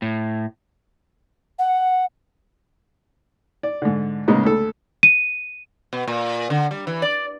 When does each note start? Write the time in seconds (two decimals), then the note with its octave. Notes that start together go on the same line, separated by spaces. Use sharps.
0.02 A2
1.58 F#5
3.63 D5
3.82 G#2 D3
4.27 A2 C#3 G#3 A#3 B3 D#4
4.44 D2 A4
5.03 D#7
5.93 B2
6.07 A#2
6.50 D3
6.71 G3
6.87 E3
7.02 D5